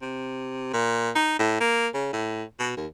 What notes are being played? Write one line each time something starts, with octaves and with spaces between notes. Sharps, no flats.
C3
A#2
D#4
A2
A#3
C#3
A2
B2
D#2